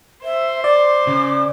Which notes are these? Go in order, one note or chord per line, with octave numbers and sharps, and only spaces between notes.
C5 E5
D5 D6
C#3